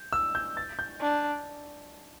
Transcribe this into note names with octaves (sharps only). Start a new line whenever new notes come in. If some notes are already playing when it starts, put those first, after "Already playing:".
Already playing: G6
E6
G6
A6
G6
D4